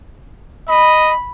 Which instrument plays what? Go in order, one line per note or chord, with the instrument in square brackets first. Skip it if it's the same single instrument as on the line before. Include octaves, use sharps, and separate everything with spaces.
[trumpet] D#5 [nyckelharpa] B5